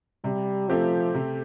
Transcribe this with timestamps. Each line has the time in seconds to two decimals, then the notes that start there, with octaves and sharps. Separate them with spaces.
0.24 C3 G3
0.69 F3 A3 C4 G4
1.15 C3